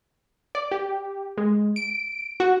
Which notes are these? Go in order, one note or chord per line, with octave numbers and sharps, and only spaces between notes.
D5
G4
G#3
D7
F#4